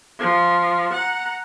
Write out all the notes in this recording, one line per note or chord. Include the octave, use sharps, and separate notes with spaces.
F3
F#5 A#5